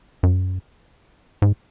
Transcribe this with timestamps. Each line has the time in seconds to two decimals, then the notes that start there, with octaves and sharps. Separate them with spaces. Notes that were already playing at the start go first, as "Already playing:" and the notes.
0.23 F#2
1.42 G#2